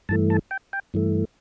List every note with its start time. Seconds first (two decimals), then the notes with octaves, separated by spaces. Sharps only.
0.09 G2 E3 A3 A5
0.30 A5
0.51 G5
0.73 G5
0.94 G2 E3 A3